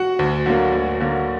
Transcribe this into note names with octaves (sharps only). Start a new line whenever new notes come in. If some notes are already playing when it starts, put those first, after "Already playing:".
Already playing: F#4 F#5
D2
D3 F#3 A#3
D2
D3 F#3 A#3